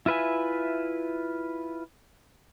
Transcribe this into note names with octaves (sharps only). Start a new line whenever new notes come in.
E4 F4 B4 E5 G#5